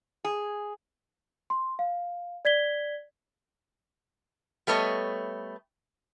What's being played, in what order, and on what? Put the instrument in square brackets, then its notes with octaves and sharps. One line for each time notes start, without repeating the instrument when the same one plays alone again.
[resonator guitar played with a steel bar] G#4
[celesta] C6
F5
D5 G#6 B6 G7
[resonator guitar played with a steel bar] G3 A3 B3 C#5 D#5